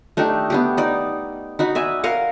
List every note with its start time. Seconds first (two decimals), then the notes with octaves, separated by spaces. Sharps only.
0.17 A3 D4 D#4 G4
0.50 B3 D4 G4
0.77 D#4 D5
1.59 D#4 F#4 B5
1.75 D5 E5 G#5
2.04 A#4 F5 F#5